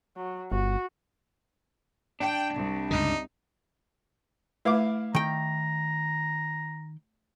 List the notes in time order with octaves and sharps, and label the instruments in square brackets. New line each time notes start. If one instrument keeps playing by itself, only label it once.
[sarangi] F#3
[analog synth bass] G1 [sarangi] F#4
[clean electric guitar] D4 [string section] G5
[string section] C2
[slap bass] C#2 G2 D3 [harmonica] D#4
[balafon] A3 B4 [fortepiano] E4 F5 D6
[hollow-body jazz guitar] D#3 G5 [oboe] A#5